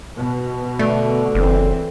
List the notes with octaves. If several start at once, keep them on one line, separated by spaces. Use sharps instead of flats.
B2
D3 A3
F#1 E3 C4